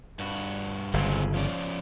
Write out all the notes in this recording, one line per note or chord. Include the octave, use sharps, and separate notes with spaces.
G2 F#4
G1 C#3 F#3 G#3 C4
F3 C#4 D5